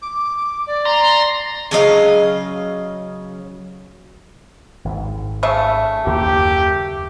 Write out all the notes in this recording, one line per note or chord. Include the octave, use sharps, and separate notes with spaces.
D6
D5
A#5 C6
C#3 F#3 D#5 F5
G#1
C#3 A3 E5
F#1 D#2 A#3 G4